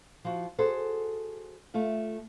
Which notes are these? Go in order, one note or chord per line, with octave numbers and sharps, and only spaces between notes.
F3 F#4
F#4 G#4 A4 C5
A3 F4 E5